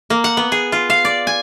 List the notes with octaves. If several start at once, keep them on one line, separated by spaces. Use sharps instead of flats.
A#3
F#5
B3
G#4
F4
F5
D5
G#5